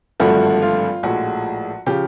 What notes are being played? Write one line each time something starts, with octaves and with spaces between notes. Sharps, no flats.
G#1 G2 D3 F3 A3 F#4
F4
A#1 A2 F3 G#3 F#4
C#3 F3 G4